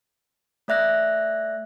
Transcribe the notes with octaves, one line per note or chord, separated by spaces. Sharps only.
A3 D5 E5 F#6 A#6